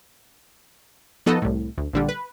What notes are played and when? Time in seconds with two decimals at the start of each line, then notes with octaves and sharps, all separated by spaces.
1.26 F3 B3 D#4 F#4 A4 D#5
1.42 C2 A2
1.78 D2
1.93 A#1 D3 G3
2.09 B4